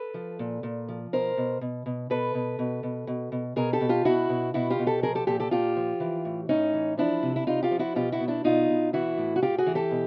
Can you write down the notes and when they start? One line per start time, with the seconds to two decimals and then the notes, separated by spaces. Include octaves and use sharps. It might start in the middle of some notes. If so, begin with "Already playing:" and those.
Already playing: A4 B4
0.14 F3
0.39 A#2
0.63 A#2
0.88 F3
1.13 B2 A#4 C5
1.37 B2
1.61 B2
1.86 B2
2.10 B2 A4 B4
2.35 B2
2.59 B2
2.83 B2
3.07 B2
3.32 B2
3.56 B2 G#4 A#4
3.73 G4 A4
3.81 B2
3.89 F4 G4
4.05 B2 E4 F#4
4.29 B2
4.54 B2 E4 F#4
4.70 F4 G4
4.79 B2
4.87 G4 A4
5.02 F3 G#4 A#4
5.15 G4 A4
5.27 A#2 G4 A4
5.40 G4 A4
5.51 A#2 F4 G4
5.76 F3
6.00 E3
6.25 A2
6.49 A2 C#4 D#4
6.73 E3
6.98 F3 D4 E4
7.23 C3
7.36 E4
7.47 C3 D#4 F4
7.63 F4 G4
7.71 F3
7.79 E4 F#4
7.96 B2 F4 G4
8.12 E4 F#4
8.20 B2
8.28 D4 E4
8.44 B2 D#4 F4
8.69 B2
8.93 E3 E4 F#4
9.18 A2
9.36 F#4
9.42 A2 F4 G4
9.58 F#4 G#4
9.66 E3
9.75 G4 A4
9.91 B2